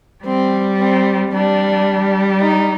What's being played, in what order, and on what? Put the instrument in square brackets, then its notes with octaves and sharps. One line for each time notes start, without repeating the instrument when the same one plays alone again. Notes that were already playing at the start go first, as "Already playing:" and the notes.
[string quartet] G3 [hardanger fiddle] C4
[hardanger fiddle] C4
[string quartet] G3 [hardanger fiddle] D4
[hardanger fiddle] D#4